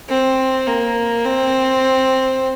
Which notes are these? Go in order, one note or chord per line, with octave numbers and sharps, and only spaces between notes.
C4
A#3
C4